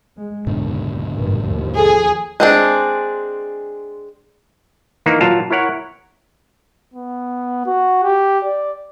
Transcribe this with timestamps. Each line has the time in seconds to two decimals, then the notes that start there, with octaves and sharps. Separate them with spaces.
0.16 G#3
0.47 F#1 D#2 G#2 B2 D3
1.13 A1 G2 A#2
1.45 D#2 F3
1.77 G#4 A4
2.40 G#3 C4 D4
5.06 D#3 E3 A#3 D#4
5.21 A#2 F#3 F4 F5 A5 A#5
5.51 E4 A#4 C#5 F#5
6.94 B3
7.66 F#4
8.04 G4
8.45 D5